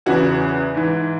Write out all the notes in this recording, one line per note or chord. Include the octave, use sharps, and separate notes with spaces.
E2 C#3 E3 F#4
G#2 E3